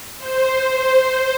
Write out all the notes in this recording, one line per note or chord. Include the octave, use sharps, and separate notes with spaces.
C5